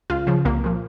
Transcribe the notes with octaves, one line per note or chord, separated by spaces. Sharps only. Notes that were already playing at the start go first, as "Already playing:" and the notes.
C#2 F4
C#3 F3
C2 A#3
A#2 F3